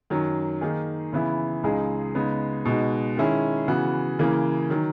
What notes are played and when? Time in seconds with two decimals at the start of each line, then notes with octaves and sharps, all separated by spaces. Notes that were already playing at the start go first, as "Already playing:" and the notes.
0.10 F#2 D#3 F#3
0.61 D#3 A#3 D#4 G#4
1.13 C#3 E3 B3 E4
1.63 C#2 C#3 G#3 D#4 G#4
2.15 C#3 G#3 B3 D#4
2.65 B2 G#3 D#4 F#4
3.17 D#3 G#3 C#4 E4 G#4
3.68 C#3 E3 B3 F#4
4.19 C#3 E3 A#3
4.70 D#3 F#3